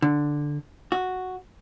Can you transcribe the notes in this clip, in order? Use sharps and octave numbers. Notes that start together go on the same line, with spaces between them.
D3
F#4